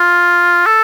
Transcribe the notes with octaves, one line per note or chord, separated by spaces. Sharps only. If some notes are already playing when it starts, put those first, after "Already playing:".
Already playing: F4
A4